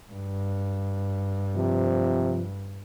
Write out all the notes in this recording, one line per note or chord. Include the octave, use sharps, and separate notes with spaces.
G2
C3 F3